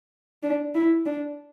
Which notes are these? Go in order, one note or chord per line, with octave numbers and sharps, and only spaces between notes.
D4
E4
D4